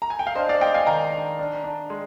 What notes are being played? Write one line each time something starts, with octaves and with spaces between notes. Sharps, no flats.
A#5
G#5
G5
F5
D4 C5 D#5
D5 F5
G#3 D#5 G5
F5 G#5
D#3 G5 A#5
D4
D4
D4
G#3